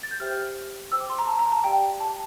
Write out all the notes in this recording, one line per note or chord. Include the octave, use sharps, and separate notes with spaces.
A6
G6
G4 C5 E5 G5 F6
C5 G5 E6
D6
C6
A#5
A5
A#5
A5
G4 D5 F5 G5
A5